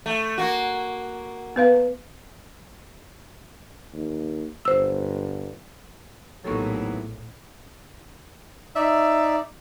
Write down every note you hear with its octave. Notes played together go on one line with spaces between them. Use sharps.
A3
A#3 F#4
B3 B4 F5
D#2
G1 C5 E6
A#1 D#2 A2 E3 F#3 B3 A4 C#6
D#4 D5 E5